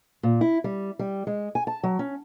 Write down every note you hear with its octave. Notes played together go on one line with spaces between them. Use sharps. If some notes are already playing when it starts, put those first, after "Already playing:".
A#2
E4
G3
G3
G#3
G#5
A5
F#3
C#4